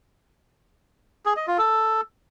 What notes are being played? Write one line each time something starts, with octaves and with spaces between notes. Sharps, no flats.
G#4
D#5
F4
A4